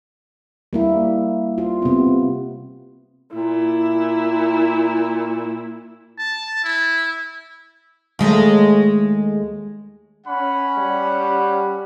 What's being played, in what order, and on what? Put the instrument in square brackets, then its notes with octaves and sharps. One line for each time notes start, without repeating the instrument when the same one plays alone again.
[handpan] G3 A#3 E4
F4
C3 B3
[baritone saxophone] A#2 [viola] E4
[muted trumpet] A5
E4
[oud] D#2 G#3 A3
[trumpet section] C#4 F#5 B5
[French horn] G3